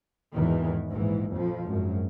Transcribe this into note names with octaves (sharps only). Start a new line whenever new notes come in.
G#1 E2 D#3 E3
A#1 G#2 E3
F2 F3
G#1 F#2